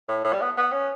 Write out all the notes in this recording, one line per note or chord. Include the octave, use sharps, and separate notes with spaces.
A2
A2
G3
B3
B3
C#4